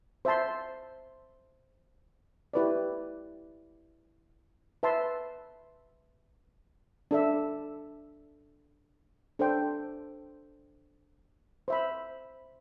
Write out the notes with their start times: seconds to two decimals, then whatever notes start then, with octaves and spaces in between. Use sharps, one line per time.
0.25 C5 E5 A5 C6
2.54 E4 G4 B4 D5
4.83 B4 E5 A5 C6
7.11 D4 A4 E5
9.39 D4 A4 C5 G5
11.68 C5 E5 B5